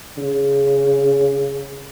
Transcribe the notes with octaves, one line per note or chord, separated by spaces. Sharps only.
C#3